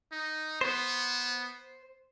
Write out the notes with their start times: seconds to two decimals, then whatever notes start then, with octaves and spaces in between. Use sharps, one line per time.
0.12 D#4
0.61 B3 C5